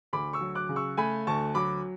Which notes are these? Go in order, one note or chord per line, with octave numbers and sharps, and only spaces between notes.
D2 B5 D6
C#6 E6
F#3
D6 F#6
C#3
C#6 E6
A3 G#5 B5
D2 A5 C#6
F#3 B5 D6